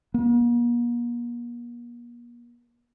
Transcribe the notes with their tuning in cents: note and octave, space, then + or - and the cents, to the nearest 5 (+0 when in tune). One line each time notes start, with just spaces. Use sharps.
A#3 +45